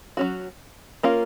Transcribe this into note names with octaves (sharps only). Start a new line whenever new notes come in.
F#3 C#4 F#4
A#3 C#4 F4 A#4